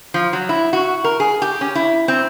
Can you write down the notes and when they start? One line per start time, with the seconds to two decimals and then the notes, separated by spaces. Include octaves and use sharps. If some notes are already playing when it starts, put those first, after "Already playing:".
0.14 F3
0.33 F#3
0.49 E4
0.73 F#4
1.04 A#4
1.20 G#4
1.42 G4
1.61 C#4
1.75 E4
2.08 C4